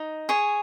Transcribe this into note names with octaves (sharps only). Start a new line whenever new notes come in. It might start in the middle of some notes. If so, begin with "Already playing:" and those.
Already playing: D#4
G#4 C#5